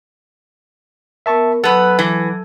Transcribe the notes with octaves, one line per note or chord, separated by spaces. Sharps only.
B3 A#4 E5 A5 C#6
F#3 B3 A4 B4
E3